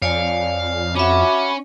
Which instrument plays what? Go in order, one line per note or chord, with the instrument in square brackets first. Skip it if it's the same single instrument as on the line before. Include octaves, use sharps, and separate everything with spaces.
[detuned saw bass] F2 [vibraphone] C#5 D5 G#5 [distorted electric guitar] F5
[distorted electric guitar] C#4 [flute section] F#4 B5 [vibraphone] E5 D6